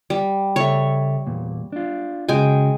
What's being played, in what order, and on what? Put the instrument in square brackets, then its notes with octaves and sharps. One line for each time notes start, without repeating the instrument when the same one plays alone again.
[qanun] G3
[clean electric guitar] C#3 A4 E5 [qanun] C#5 C#6
[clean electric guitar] E2 A#2
D4 F4
[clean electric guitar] C#3 F#4 [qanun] G#3 G5 G#5